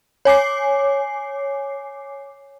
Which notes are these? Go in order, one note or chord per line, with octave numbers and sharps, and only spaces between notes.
C#5 G#5 D6 C7